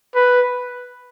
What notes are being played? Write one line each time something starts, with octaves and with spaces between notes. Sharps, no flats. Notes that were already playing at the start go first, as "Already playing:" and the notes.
B4